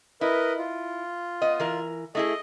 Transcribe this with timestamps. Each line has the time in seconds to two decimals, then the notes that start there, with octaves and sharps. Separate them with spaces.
0.21 E4 A#4 B4 D#5
0.58 F4
1.42 B3 D#5
1.60 E3 A#4
2.15 A3 E4 G#4 D#5